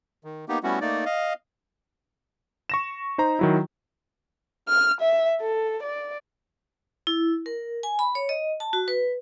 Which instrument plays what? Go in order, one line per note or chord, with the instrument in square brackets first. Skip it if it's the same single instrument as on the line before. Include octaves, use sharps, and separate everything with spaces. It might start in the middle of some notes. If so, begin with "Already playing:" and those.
[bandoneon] D#3
A#3 B3 D#4 G4
G3 A3 B3 C#4 E4 F#4
A3 A#3 D#4 D5
D#5 F5
[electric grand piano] C#6 A#6 E7
D#4 C5 A#5
D#3 F#3 E4
[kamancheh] F6
E5
A4
D5
[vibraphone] E4
A#4
G#5
B5
C#5
D#5
A5
F#4
B4